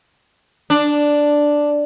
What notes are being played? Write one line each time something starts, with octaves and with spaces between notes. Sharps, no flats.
D4